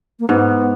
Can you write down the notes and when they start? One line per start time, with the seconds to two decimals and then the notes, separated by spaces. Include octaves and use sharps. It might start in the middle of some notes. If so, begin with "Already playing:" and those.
0.20 A#3
0.28 G#2 B3